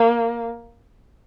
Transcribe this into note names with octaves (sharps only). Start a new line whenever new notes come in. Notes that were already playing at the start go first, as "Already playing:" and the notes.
Already playing: A#3